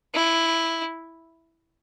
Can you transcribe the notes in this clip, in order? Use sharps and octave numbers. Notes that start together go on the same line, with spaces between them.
E4